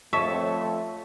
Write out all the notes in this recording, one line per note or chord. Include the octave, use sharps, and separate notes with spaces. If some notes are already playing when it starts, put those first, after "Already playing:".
F2 A3 C#5 D#5 E5 A5 C#6